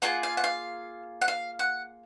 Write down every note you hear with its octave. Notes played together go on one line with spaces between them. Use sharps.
A#3 F4 G#4 F#5
F5
F#5
F5
F#5
F5
F#5